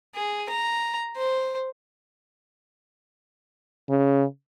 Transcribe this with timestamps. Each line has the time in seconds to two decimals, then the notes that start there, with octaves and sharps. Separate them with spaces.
0.15 G#4
0.49 A#5
1.17 C5
3.90 C#3